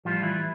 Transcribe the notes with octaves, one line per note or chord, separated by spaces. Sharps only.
A2 F3 G3 F4
E3 E4